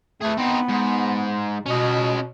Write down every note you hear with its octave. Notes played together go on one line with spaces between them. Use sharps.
A3 G#4 B4
B3 C4 D#4
G#2
B2 C#4 D#5